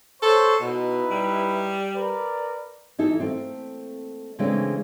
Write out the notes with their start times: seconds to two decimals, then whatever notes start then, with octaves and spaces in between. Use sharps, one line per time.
0.22 A4 C5 C#5 C#6
0.61 B2 D#4 E4 B4
1.11 G3
1.94 A#4 B4 D5
2.99 E3 D#4 E4 A4
3.20 A3 A#3 C4
4.39 C#3 E3 G#3 A3 C4 D4